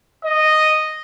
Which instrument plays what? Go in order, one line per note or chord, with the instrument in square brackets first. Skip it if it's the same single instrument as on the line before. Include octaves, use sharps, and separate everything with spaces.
[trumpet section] D#5